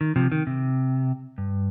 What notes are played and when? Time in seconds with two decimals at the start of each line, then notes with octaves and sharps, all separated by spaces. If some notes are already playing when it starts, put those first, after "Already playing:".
0.01 D#3
0.16 C3 F3
0.32 D#3
0.47 C3
1.38 G2